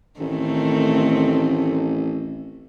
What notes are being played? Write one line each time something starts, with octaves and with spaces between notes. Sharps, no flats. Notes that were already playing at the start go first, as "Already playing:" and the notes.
A1 D#3 A3 C4